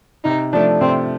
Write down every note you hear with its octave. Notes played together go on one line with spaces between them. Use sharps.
C3 D#4
F3 A3 D4
C3 C4